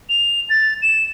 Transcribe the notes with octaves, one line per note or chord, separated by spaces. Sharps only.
F7
A6
E7